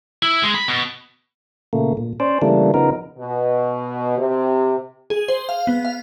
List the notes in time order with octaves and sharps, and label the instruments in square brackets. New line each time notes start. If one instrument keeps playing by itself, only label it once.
[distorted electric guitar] E4
G#3
B5
B2
[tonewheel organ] A#2 C#3 A3 A#3
A#2
C#4 C5 D5
C#3 E3 G3 A3 A#3 D4
C#3 F3 B3 D#4 A#4
[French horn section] B2
C3
[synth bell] G#4
C5
F5
B3
F5